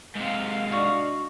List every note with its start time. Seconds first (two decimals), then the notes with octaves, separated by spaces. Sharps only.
0.16 G#2 C3 F5
0.72 D4 F#4 D#5